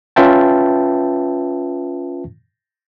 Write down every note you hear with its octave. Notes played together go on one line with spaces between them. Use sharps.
C#4 F4 B4 E5 G5 A5